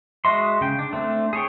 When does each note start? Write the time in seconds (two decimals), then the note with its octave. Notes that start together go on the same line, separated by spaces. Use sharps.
0.25 G#3 F#4 D#5 E5 C6
0.61 C#3 G5
0.79 D4
0.93 A3 C4 D4
1.33 G#4 A4 C#5 G5